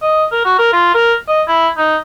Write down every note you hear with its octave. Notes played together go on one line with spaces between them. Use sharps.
D#5
A#4
F#4
A#4
F4
A#4
D#5
E4
D#4